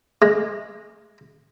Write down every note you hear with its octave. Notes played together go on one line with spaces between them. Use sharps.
G#3